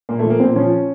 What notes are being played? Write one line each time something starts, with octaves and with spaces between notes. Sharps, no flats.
A#2 A#3
A3
F3 A#3
A#2 C4
F3 C#4